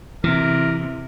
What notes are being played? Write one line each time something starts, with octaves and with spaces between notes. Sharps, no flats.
C3 E3 A#4